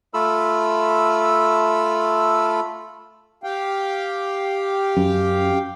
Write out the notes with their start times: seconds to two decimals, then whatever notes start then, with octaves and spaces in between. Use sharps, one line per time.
0.14 A3 F4 A4 B5 E6
3.43 G4 F5 G5
4.97 F#2